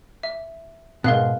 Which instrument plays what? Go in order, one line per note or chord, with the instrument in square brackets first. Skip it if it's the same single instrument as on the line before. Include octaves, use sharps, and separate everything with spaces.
[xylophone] E5
[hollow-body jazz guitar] G#2 B2 [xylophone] A#4 F5 F#6